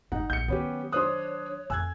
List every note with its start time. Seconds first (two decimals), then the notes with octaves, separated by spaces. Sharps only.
0.12 G#1 D4 D#4 F#5
0.30 A#1 G6 C#7
0.48 D#3 F#3 B3 C#4 G4
0.92 D4 C5 C#5 C6 D#6 F#6
1.70 F2 G#5 E6 F#6 G#6